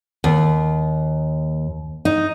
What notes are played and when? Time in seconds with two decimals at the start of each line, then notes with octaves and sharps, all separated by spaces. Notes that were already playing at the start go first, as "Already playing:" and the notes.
0.24 D#2
2.05 D#4